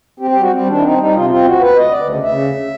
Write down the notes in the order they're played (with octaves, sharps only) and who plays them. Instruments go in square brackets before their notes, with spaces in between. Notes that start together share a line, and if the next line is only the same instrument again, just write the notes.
[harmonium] C4 G4
G4
G3 F#4
G3 C4
D#3 D4
E4
C4 D#4
G3 D#4
C3 F4
C4 F4
D2 F#4
D2 B4
D2 D#5
D2 D5
C#3
C#3 E5
D2